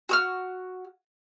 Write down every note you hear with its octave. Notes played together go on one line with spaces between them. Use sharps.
F#4 E6 F6